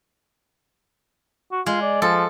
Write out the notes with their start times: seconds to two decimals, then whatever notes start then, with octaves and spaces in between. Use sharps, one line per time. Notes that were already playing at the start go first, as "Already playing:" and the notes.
1.52 F#4
1.66 G#3 F4
1.82 D5
2.02 F3 A4